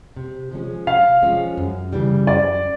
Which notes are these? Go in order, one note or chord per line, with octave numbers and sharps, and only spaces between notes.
C3
F3 G#3 C#4
C3 F5
F3 G#3 C#4
F#2
C#3 E3 G3
F#2 D5